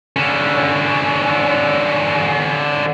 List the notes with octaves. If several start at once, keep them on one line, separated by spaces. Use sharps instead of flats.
D3 C#4